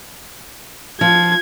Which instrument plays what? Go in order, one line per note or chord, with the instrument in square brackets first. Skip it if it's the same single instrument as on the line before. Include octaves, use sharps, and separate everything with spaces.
[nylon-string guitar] F3 [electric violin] G#6